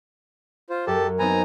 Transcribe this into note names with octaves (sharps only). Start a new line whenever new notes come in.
F4 C5
F#2 G4 A4 A5
B3 C4 D#4 G#5 A#5